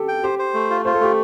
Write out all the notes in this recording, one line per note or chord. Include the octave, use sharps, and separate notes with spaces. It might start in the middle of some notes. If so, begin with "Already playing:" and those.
Already playing: G4 A4
G5
G4 C5
C5
A3
F4
F4 C5
A4
A3 G4